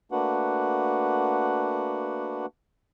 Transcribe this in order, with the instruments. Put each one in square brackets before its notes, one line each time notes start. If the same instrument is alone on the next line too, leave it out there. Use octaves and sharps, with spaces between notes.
[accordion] A3 A#3 D4 F#4 B4 F#5